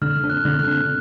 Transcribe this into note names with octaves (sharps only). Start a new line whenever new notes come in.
D3 F6
D4
F#6
D3
F#6
D4